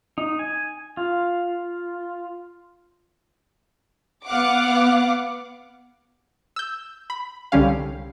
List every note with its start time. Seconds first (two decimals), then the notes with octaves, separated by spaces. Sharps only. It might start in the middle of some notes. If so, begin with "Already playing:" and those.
0.18 D#4
0.39 G#5
0.97 F4
4.27 B3 F5 F#5 D6
6.56 E6 G6
7.10 B5
7.52 C2 D3 G3 C#4 F5